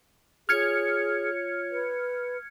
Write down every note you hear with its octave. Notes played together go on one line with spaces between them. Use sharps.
F4 G#4 C#5 F6 G#6 C#7
B4